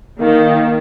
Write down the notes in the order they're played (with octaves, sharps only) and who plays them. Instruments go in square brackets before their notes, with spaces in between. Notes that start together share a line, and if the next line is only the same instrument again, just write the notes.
[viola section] D#3 [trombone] A#3